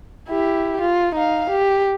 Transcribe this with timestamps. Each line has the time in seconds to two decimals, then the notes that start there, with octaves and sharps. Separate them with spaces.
0.28 E4 G4
0.81 F4
1.15 D#4 F5
1.50 G4